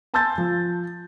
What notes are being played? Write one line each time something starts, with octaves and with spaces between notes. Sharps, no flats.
G#5 A5 C6 E6 G6 A6
F3